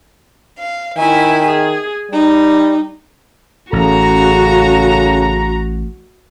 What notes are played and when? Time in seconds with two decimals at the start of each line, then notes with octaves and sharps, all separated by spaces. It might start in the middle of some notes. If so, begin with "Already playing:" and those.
0.58 F5
0.97 D#3 E4 E5 G#5
1.47 G#4
2.11 G3 D#4
3.73 A1 C#3 F#4 A4 A#5